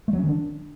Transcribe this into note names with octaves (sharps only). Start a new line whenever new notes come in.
A3
F#3
C#4
D#3
D4